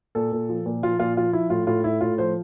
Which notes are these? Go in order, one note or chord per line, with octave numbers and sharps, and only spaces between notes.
A#2 A4
A#2
F3
A#2
F3 F4
A#2 F4
F3 F4
F3 E4
A2 F4
A2 F4
A2 E4
A2 F4
F3 C5